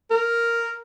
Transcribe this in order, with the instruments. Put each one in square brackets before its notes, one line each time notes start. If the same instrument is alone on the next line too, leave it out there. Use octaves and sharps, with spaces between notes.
[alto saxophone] A#4